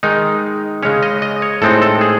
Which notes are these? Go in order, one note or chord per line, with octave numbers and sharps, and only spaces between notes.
D#3 G#3 D#4
C#3 G#3 C#4 C#5
D#5
D#5
C#5
A2 G#3 C4 D#4 A4
A4
G#4